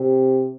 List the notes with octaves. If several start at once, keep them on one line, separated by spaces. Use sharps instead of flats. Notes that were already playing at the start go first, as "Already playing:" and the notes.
Already playing: C3